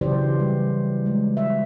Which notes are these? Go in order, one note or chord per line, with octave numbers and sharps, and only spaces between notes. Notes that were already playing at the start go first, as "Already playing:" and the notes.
C#3 E3 F#3 G4 C5 D5
G3
G#3
E5